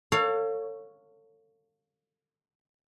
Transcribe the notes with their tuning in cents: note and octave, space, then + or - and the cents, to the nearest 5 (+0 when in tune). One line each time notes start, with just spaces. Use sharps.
A4 +35 C#5 +0 F5 +15